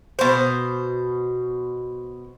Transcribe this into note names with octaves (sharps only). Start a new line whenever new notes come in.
B2 C5